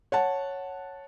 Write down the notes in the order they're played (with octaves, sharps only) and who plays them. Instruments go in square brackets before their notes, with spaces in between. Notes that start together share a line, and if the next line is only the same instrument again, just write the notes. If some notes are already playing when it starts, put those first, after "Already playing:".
[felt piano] C#5 F#5 A5